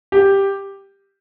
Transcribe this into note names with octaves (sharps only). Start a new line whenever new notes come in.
G4